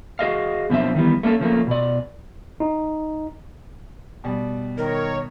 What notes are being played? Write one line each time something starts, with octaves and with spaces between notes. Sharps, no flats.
F#4 G#4 D#5 F5
F#2 B2 F3 C4 D4 E5
D#3 E3 G3 B3
A3 A#3 C#4 A4
C#3 F3 A3 A#3
B2 D5
D#4
B2 G3
D#3 A#4 C#5